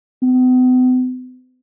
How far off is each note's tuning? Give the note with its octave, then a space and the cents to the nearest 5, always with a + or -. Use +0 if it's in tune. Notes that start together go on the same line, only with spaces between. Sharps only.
B3 +45